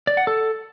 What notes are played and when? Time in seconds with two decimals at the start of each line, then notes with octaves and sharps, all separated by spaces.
0.07 D5
0.17 F#5
0.27 A4